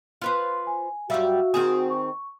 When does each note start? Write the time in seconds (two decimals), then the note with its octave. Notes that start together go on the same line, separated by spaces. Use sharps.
0.22 F4 B4 C5
0.67 G#5
1.10 F#2 G3 F#4 E5 F5 E6
1.54 D#3 C4 G#4 D#6
1.90 C#6